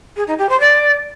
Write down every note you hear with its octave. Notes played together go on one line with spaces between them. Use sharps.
G#4
D#4
G4
C5
D5